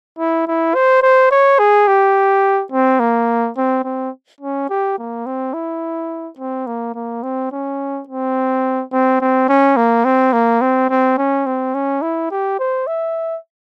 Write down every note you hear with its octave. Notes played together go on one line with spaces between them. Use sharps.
E4
E4
C5
C5
C#5
G#4
G4
C4
A#3
C4
C4
C#4
G4
A#3
C4
E4
C4
A#3
A#3
C4
C#4
C4
C4
C4
C#4
A#3
C4
A#3
C4
C4
C#4
C4
C#4
E4
G4
C5
E5